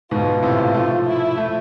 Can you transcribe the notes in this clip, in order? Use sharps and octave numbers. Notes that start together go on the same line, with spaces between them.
G#2 B2 F4
A2 C3
F3 A3
E4
F3 A3